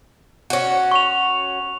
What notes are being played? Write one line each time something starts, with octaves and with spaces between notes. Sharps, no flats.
C#4 F#4
C#6 F7